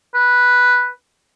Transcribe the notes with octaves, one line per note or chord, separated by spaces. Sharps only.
B4